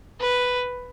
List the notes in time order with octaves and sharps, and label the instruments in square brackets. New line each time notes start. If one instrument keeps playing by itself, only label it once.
[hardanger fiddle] B4